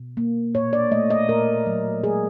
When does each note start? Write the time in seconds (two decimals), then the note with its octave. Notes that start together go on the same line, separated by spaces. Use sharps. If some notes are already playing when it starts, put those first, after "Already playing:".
Already playing: B2
0.17 A#3
0.55 A#2 C#5
0.73 D5
0.91 A3 D#5
1.10 D#5
1.29 A#2 A#4
1.66 F#3
2.03 G#3 G#4